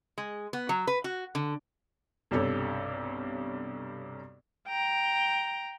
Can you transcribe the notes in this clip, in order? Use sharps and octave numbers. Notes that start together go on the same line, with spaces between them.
G#3
B3
F#3
B4
F#4
D3
B1 G2 C3 G4 A4 C#5
G5 A#5